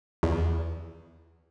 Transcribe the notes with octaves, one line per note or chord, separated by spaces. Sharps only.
E2